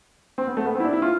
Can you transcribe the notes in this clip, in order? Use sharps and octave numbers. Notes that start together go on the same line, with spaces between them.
C4
B3
A3
B3
C4
E4
D4
E4
F4